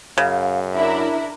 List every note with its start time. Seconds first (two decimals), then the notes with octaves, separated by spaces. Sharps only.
0.18 F#2 C#3 F5
0.75 D4 E4 A#4 E5